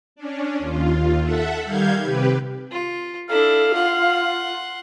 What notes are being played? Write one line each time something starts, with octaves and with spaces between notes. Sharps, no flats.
C#4 D4
D#2 F4
A4 E5 F#5
D#3 G3 F5 G6 G#6
C3 G4 B4
F4
D4 E4 A4 F5
F4 F#5 C6